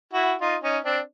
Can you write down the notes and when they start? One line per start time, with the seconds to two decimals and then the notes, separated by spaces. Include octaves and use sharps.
0.13 E4 F#4
0.41 D#4 F4
0.63 C#4 D#4
0.84 C4 D4